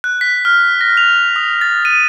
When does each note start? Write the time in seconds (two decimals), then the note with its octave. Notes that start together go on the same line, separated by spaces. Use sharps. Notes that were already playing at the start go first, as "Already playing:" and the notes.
0.04 F#6
0.21 B6
0.45 F6
0.81 A#6
0.97 F7
1.36 D#6
1.61 A6
1.85 D#7